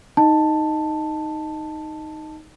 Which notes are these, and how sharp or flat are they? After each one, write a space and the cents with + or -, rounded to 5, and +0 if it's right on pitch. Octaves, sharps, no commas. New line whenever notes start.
D#4 +0 D#5 +0 A5 +5